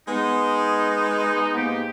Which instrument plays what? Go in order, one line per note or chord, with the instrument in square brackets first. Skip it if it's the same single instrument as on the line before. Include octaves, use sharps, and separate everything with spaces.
[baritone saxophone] G#3 [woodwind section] B3 D#4
[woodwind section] G#2 A#3 G4